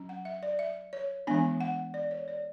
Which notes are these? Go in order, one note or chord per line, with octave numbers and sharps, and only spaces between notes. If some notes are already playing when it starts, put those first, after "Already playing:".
Already playing: F#3 C#4
F#5
E5
D5
E5
C#5
E3 G#3 B3 D4 G#5
F#5
D5
C#5
D5